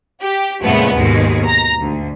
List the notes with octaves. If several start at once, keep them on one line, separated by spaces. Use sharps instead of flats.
G4
F2 A#2 C#3 G#3 A3 B3
D#2 G#2 B2 D#3 G#3
A#5 A#6
D2